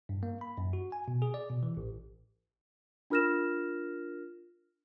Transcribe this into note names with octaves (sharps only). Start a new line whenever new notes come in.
G2
A#3
B5
F#2
F#4
G#5
B2
G#4
D5
B2
E3
A1
D4 F4 A#4 F6 A#6 E7